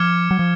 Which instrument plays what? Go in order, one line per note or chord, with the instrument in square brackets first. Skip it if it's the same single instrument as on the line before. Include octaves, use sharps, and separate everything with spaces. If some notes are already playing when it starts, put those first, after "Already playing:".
Already playing: [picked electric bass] F3 [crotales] D6 F6 G#6 C#7
[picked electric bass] F#3
F3